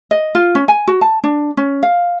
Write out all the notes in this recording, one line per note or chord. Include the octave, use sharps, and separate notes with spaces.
D#5
F4
C#4
G#5
F#4
A5
D4
C#4
F5